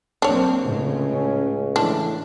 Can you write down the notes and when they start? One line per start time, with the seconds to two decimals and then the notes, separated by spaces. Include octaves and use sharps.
0.22 F#3 A#3 C4 D4 C#5
0.64 C#2 A2 C#3 G#3
1.13 C#4
1.76 A2 E3 D4